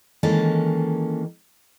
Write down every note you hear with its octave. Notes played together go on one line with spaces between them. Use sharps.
D#3 E3 G#3 A#3 C#4 A4